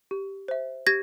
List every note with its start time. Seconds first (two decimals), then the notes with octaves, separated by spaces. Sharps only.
0.11 G4
0.48 C5 E5
0.87 G4 G#6 A#6